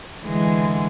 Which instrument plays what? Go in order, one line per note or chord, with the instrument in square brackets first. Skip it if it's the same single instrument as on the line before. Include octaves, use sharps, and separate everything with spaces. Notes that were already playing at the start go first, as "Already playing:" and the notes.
[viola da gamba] D3 E3 G#3